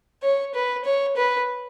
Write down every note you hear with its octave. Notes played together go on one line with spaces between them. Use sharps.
C#5
B4
C#5
B4